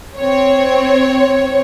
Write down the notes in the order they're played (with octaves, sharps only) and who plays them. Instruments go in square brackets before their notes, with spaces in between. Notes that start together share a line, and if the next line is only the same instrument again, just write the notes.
[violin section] C4 C#5